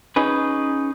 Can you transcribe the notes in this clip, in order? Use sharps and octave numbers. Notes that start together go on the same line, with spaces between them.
C#4 D#4 G#4 B4